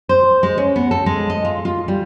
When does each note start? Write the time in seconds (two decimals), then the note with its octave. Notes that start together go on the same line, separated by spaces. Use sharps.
0.09 C5
0.43 G#3
0.58 C#4
0.76 B3
0.91 A4
1.06 G#3
1.30 D#5
1.45 F4
1.65 F4
1.88 G3